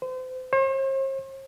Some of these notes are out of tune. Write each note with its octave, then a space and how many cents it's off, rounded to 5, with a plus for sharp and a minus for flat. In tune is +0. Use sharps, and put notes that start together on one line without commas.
C5 -35
C5 +45